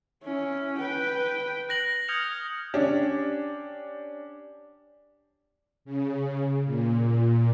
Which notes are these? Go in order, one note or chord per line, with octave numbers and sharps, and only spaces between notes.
C#4 E4
B4 G5
F#6 A#6 F#7
D#6 F6 G6 G#6 C#7 F7
C#4 D4 G4
C#3
A#2